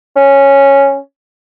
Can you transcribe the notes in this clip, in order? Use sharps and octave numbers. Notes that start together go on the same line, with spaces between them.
C#4